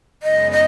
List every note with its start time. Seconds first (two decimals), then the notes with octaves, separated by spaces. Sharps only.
0.23 F#2 C#3 G#3 B3 D#4 D#5
0.52 D#5